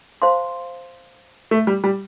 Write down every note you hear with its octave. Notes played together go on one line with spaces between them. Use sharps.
C5 F5 A5 C6
A3
G3
G3